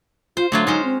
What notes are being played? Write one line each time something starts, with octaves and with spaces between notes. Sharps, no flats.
F4 C5
D3 F#3 A3 F4
G#3 C#4 D#4 C5
C4